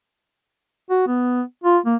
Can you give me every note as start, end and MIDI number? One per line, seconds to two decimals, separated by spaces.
0.90 1.06 66
1.07 1.42 59
1.64 1.78 65
1.86 1.96 58